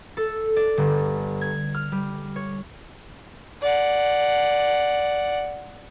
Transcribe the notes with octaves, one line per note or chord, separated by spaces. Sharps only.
A4
D5
G1
G#6
F6
G3
C#5
D5 F#5